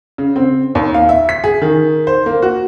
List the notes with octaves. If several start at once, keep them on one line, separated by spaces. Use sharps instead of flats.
C#3
C4
D#2
F5
E5
B6
G#4
D#3
C5
A#3
F#4